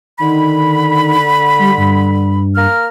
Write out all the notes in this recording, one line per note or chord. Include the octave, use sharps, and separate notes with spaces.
D3 D#3 B5
G3
G2
A#3 A#5 F6